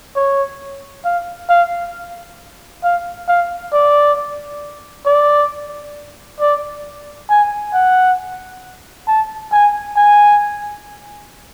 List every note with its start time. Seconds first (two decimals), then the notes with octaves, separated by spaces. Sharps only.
0.16 C#5
1.05 F5
1.49 F5
2.83 F5
3.28 F5
3.73 D5
5.06 D5
6.40 D5
7.30 G#5
7.73 F#5
9.08 A5
9.53 G#5
9.97 G#5